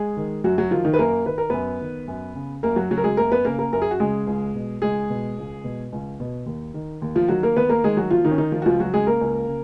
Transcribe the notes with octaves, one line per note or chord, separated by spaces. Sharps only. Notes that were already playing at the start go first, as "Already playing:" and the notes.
Already playing: G#3 G#4
D#3
F#2 F#3 F#4
F#3 F#4
D#3 F3 F4
D#3 D#4
B4
F#2 A#3 A#4
D#3 B4
A#4
F#2 B3 B4
D#3
F#2
C#3
F#2 A#3 A#4
F#3 F#4
C#3 F#3 F#4
A#4
G#3 G#4
F#2 A#3 A#4
B3 B4
C#3 A#3 A#4
A#3 A#4
F#2 A#4
G#4
F#4
C#3 G#3 G#4
C#2
B2
C#2 G#3 G#4
B2
C#2
B2
C#2
B2
D#2
D#3
D#2
F3 F4
D#3 F#3 F#4
A#3 A#4
D#2 B3 B4
A#3 A#4
D#3 G#3 G#4
F#3 F#4
D#2 F3 F4
D#3 D#4
C#4
D#3 D#4
F3 F4
F#4
C#2 F3 F4
F#3 F#4
C#3 G#3 G#4
A#3 A#4
C#2
C#3